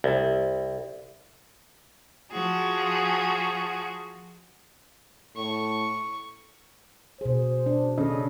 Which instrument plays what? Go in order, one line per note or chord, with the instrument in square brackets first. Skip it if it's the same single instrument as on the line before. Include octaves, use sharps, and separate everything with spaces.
[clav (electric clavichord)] C2
[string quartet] F3 F#4 G#4
[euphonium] A2 [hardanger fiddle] C#6
[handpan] B2 G#4 [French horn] C5
[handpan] D4
[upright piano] C#3 [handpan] A4 D#5